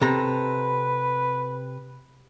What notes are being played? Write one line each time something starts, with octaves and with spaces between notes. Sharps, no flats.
C3 A4 B4 A#5